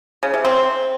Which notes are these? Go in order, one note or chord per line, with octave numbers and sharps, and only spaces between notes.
C#3
C3
C4